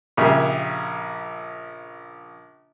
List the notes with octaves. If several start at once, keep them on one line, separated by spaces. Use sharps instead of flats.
A#1 C#3 G4 E5